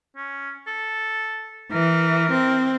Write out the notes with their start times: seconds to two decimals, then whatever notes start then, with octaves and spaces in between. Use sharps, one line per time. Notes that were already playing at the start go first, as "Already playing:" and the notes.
0.16 C#4
0.67 A4
1.72 E3 A#4
2.32 C4